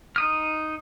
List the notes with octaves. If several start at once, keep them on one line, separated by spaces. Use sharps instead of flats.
D#4 D#6 F6